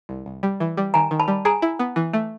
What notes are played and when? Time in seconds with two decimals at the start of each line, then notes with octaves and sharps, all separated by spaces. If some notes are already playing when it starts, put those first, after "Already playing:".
0.09 C2
0.26 C2
0.43 G3
0.60 E3
0.77 G3
0.94 D#3 G#5 A#5
1.11 D#3
1.20 A5 B5
1.28 G3
1.45 G#4 G#5 A#5
1.62 E4
1.79 B3
1.96 E3
2.13 A3